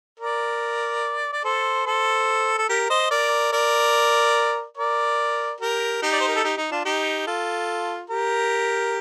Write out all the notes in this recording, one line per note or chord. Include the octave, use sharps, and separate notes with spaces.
A#4 D5
D5
A4 C5
A4 C5
A4
G4 A#4
C5 D#5
A#4 D5
A#4 D5
A#4 D5
G4 A#4
D#4 G4
D5
C5
A#4
A4
D#4 G4
D#4
D4 F4
D#4 G4
F4 A4
G4 A#4